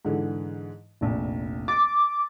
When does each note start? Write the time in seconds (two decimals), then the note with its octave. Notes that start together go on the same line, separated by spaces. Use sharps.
0.05 G#2 D3 E3
1.01 F1 A#1
1.68 D6 A6